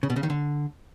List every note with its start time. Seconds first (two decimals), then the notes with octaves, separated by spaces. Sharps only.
0.03 C#3
0.10 B2
0.16 C#3
0.23 D#3
0.30 D3